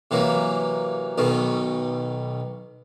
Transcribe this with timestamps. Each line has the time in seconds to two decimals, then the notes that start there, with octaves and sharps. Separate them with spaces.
0.11 C3 E3 F#3 A#3
1.18 B1 B2 D#3